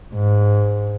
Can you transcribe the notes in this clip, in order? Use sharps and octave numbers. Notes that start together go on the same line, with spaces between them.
G#2